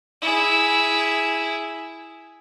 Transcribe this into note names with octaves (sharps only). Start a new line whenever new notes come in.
E4 G#4